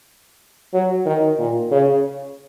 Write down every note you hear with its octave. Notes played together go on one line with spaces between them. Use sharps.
F#3
D#3
A#2
C#3